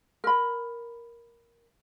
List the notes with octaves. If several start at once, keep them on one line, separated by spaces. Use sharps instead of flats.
A#4 B5